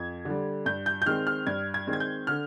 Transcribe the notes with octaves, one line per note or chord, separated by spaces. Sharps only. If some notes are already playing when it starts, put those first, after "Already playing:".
Already playing: F2 G#6
D3 G3
G2 G6
G6
G6
D#3 G#3 C4 F6
F6
G2 G#6
G#6
D#3 G#3 C4
G#6
G6
D3 F6